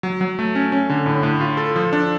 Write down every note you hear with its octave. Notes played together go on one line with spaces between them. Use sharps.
F#3
F#3
A3
C#4
C#4
D3
A2
A2
F4
A4
F3
D4